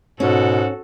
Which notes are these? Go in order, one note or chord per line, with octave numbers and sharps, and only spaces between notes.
G#2 B2 C#4 F#4 A4